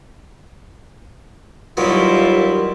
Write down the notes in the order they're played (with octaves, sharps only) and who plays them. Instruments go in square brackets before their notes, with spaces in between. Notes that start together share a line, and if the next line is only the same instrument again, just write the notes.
[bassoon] D#2 [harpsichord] F#3 B3 [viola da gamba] G3 E4 [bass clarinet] F4